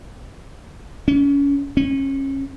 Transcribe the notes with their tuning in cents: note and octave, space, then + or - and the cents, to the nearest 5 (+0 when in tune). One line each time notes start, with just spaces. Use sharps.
C#4 +30
C#4 -30